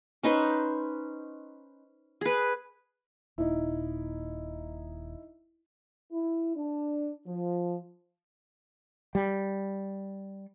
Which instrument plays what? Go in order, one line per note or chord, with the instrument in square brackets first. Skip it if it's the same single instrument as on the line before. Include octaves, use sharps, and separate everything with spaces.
[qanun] C#4 D#4 B4 C5
G#4 B4
[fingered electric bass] D#1 A#2 [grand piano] D#4 E4
[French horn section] E4
D4
F3
[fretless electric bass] G3